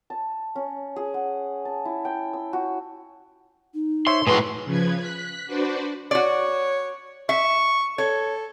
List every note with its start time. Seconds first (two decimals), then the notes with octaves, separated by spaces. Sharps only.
0.10 A5
0.55 C#4
0.96 G#4
1.14 F#5
1.65 A5
1.85 E4
2.05 G5
2.33 E6
2.53 F#4
3.74 D#4
4.07 C5 C#5 E5 C6
4.27 A2 F#3 E4 G#4 B4 C6
4.65 C#3 F3 B4 G#6
4.97 F#6 B6
5.46 D4 F#4 B4 C5 D5
6.11 F#4 C#5 D5
7.29 E5 C#6
7.98 A4 C#5